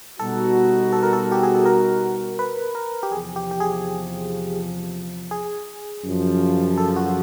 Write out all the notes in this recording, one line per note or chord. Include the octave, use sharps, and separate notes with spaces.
B2 G3 B3 D#4 F#4 A4
A4
A#4
A4
G4
G#4
A4
A#4
B4
A#4
G4
E2 C3 F3 G#4
G4
G4
G#4
G#4
F#2 C#3 F3
A4
F#4